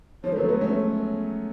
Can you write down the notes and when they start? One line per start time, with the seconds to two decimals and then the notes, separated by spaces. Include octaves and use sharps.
0.24 F3 G#3 C#5
0.33 A4
0.36 F#3 A3
0.40 B4
0.48 G#3 B3
0.57 A3 C#4 C#5